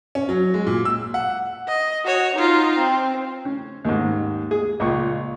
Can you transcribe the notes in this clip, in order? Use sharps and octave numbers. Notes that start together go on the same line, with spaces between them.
C#4
F#3
G#3
A#2
E6
F#5
D#5
F#4 C#5
D#4 F4
C4
C#4
D#2 G#2
G#4
C#2 A#2 C#6